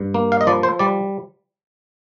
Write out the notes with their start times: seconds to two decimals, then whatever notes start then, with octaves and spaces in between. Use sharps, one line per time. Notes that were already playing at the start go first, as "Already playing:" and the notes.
Already playing: G2
0.14 A#3
0.32 F5
0.41 D#5
0.47 F3 D5
0.63 C5
0.79 G3 D5